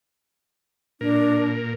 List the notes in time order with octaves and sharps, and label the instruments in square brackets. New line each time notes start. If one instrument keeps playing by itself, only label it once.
[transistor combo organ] A#2 A#4 [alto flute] D4